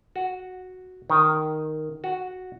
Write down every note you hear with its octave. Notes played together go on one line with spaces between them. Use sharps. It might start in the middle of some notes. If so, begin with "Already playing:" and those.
F#4
D#3
F#4